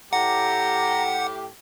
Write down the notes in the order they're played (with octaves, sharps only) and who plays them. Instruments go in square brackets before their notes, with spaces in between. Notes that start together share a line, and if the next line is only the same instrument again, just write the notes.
[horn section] A2 G4 [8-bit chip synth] F#5 [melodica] A#5